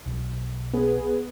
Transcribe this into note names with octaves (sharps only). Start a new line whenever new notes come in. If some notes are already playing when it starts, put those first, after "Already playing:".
B1
B3 G#4 B4